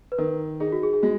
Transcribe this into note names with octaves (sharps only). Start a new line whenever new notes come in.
B4
D#3 A#4
D#4 G#4
F#4
G#4
G#4
G#3 F#4